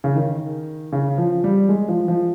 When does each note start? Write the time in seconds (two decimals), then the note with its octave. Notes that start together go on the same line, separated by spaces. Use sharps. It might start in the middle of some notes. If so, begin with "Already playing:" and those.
0.04 C#3
0.15 D#3
0.92 C#3
1.18 F3
1.44 G3
1.69 G#3
1.88 F3
2.08 F3